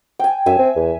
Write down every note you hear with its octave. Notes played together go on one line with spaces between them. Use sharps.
G5 G#5
F#2 E5 G#5
C4
E2